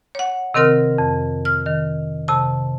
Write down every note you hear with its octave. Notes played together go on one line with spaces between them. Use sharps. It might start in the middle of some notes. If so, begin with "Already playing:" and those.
C#5 F#5
C3 D#3 C4 A#4 F6
F2
F6
D#3
C3 A5